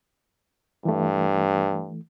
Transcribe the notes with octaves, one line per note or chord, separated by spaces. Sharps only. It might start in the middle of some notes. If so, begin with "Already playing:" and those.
G2 E3 A3